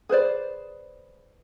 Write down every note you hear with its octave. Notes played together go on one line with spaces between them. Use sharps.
G#4 B4 C5 D5